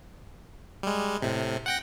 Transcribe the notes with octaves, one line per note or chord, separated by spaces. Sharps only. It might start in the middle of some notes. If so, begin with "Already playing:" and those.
G3 G#3
A2 C3
F#5 G5 A#6